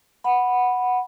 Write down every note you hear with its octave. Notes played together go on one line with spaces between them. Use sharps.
F#5 B5